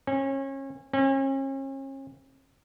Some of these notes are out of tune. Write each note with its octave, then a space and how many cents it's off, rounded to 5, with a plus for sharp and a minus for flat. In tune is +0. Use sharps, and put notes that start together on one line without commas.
C#4 -30
C#4 -40